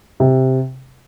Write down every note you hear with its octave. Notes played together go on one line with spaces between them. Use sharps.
C3